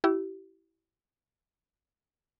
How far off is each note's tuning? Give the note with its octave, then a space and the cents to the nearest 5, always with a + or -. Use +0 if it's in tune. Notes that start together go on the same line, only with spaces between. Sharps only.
E4 +0 G4 -35